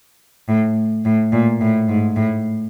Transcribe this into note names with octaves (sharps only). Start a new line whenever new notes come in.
A2
A2
A#2
A2
G#2
A2